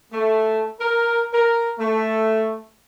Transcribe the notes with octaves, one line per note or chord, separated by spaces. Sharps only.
A3
A#4
A#4
A3